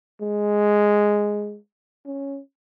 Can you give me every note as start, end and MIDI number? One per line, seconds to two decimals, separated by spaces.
0.21 1.57 56
2.06 2.39 61